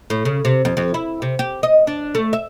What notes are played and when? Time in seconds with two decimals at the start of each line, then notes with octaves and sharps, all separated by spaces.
0.10 A2
0.25 C#3
0.45 C3
0.65 F2
0.77 F2
0.94 E4
1.22 C3
1.39 G4
1.63 D#5
1.87 D4
2.15 A3
2.33 E5